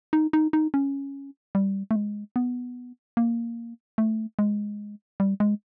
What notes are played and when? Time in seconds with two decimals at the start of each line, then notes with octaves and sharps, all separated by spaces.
0.13 D#4
0.33 D#4
0.53 D#4
0.74 C#4
1.55 G3
1.91 A3
1.96 G#3
2.36 B3
3.17 A#3
3.98 A3
4.39 G#3
5.20 G3
5.40 G#3